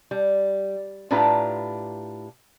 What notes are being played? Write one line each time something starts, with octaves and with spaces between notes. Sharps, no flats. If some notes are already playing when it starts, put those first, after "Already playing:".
G3
A2 D4 F4 G4 B4 A#5